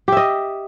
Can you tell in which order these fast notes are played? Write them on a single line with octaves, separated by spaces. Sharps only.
G4 E5 D#5